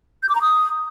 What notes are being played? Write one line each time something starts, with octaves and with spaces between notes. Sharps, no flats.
G6
D6
A#5
D#6